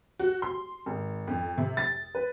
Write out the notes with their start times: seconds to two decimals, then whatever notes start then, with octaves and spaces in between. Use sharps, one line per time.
0.19 F#4
0.42 C6
0.86 G#1
1.28 F2
1.58 C3
1.77 A6
2.15 B4